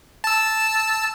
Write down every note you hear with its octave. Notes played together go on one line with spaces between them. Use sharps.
A5 E6